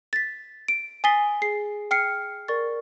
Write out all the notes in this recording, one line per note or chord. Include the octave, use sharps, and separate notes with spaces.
A6 B6
D7
G#5 D#6 A6 B6 C7 G7
G#4 C7
G5 F6 C7 C#7
A#4 D5 C#6 A6